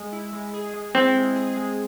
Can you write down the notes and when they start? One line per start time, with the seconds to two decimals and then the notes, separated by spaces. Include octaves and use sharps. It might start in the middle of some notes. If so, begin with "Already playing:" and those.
Already playing: G#3
0.12 E4
0.33 G#3
0.53 G#4
0.74 G#3
0.95 C4 E4
1.15 G#3
1.36 G#4
1.57 G#3